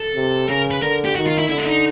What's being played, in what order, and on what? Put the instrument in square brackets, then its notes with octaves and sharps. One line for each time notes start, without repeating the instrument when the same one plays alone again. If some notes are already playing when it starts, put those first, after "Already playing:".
Already playing: [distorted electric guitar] A4
[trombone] C3
[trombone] C#3 [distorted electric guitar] A#4
[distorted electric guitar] B4
[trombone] D3 [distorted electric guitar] A#4
[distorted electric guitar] G4
[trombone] D#3 [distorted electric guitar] F#4
[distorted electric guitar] F4
E4
[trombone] D3 [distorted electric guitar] E4
[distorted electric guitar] D4
D#4